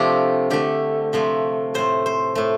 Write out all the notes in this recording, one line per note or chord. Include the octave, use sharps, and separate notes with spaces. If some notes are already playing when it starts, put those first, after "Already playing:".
Already playing: C3 F3 A3 C4 D4 F4 G4
D3 A3 G4
C3 F3 A3
A2 A3 C5
C5
A2 A3